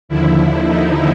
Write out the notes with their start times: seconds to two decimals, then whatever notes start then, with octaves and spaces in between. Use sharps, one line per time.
0.09 D#2 D3 F3 E4
0.38 E4
0.66 D#4